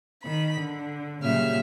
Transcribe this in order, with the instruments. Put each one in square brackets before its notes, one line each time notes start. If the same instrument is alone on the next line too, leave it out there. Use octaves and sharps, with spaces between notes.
[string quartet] D#3 B5
D3
A#2 C#3 F#3 G3 E5 F6